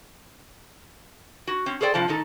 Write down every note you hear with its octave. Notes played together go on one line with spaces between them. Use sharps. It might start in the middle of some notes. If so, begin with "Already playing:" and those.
F#4
C4 C#4
G#4 A4 C5 D5 G5
G2 C3 F3 C5 A5
A2 D#3 D#4 A4